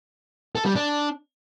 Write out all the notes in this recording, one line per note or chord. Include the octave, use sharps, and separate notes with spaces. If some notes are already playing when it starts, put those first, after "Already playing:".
A4
G3
D4